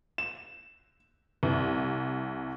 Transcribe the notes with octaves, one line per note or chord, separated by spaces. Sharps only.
E7
C2